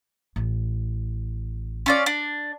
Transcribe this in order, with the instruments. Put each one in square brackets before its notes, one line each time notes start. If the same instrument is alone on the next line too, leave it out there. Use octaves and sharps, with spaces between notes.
[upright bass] A1
[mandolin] C#4 F4 D5
D4